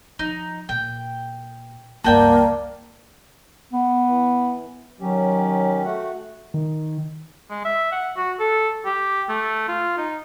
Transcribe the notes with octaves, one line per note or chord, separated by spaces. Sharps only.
F3 D#4
A#2 G5
C#2 G2 A#3 F#4 D5 G5 A5
B3
E3
D#3 F#3 C#4 G4
A3 F#4 F#5
D#3
G#3
E5
F#5
F#4
A4
G4
A3
F4
D#4